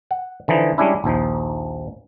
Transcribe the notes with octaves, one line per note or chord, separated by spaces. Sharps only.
F#5
D3 E3 F3 D#4
G3 G#3 C#4 D4 E4
A#1 D#2 F3 D#4